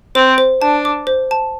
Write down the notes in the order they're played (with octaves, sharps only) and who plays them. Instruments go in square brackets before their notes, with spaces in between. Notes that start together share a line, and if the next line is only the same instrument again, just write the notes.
[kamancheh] C4 [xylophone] C5
[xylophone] C5
[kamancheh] D4 [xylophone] A5
[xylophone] D6
C5
A5